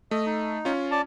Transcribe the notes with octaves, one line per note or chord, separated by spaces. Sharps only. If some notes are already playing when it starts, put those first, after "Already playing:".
A3 D#5
D#4
C#4 F4
D5 A5